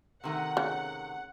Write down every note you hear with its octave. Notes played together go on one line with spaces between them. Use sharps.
C3 D#3 A3 F#5
C#3